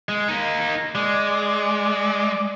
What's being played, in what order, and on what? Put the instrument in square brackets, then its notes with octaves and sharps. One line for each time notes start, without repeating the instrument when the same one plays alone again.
[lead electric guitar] G#3
A#3 D#4
[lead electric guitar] G#3 [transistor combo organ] D5